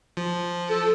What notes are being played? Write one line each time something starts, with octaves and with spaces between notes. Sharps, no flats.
F3
A4